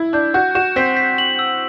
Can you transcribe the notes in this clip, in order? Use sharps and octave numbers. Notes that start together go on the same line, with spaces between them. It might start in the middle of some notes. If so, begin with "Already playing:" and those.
Already playing: E4
D4 G6
F#4 G6
F#4 E7
C4 B6
B6
F#7
E6